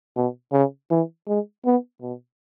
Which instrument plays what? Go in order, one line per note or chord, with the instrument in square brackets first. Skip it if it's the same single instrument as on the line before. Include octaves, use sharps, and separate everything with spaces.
[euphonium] B2
C#3
E3
G#3
B3
B2